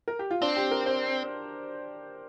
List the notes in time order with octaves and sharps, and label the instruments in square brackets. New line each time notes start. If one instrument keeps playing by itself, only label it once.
[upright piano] A#4
G4
F4
[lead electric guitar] C4 [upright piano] D4
[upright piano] G4
A#4
C5